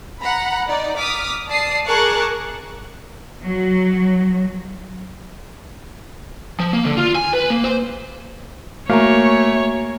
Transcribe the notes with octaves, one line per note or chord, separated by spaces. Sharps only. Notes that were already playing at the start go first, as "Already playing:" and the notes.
F#5 A#5 B5
D#4 D5
D6 D#6 F6 B6
D5 A5 D#6 C7
G#4 A#4 A5 C#6 D6 F#6
F#3
F3
A#3
D3
F4
G#5
B4
A#3
C5
A3 A#3 F#4 C#5 G#5 A#5